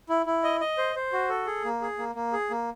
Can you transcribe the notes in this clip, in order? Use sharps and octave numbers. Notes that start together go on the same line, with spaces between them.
E4
E4
D#5
D#5
C5
C5
F#4
A4
G#4
A#3
G#4
A#3
A#3
G#4
A#3